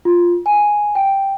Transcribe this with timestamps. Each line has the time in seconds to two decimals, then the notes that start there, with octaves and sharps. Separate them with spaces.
0.05 F4
0.46 G#5
0.95 G5